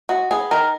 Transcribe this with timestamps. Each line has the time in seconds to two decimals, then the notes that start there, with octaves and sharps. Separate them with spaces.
0.09 G#3 F#4
0.31 B3 G#4
0.51 D#3 A#4